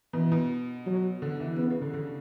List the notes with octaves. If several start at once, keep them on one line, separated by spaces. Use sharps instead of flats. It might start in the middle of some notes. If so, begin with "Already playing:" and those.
B2 E3
B2
F#3
D3
E3
C#3 B3
C#3
D3
D3